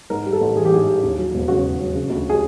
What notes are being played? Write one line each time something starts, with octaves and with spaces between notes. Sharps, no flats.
G#2 A#4
G3
A4
A1
E3 G#4
G4
G#2 G#4
G3
D#2
F#3
E1
C#3 F#4
D#2
F#3
C#3
D2
G#4